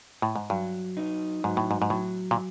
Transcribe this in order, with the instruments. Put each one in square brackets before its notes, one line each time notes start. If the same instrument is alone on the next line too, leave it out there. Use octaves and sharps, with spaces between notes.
[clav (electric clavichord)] A2
G#2
[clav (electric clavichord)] G2 [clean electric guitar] F#3
[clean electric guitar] D#4
[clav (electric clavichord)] G#2 [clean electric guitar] F#3
[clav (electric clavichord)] A2
G#2
G#2
[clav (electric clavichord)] A2 [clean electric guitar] F#3
[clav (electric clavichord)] A#2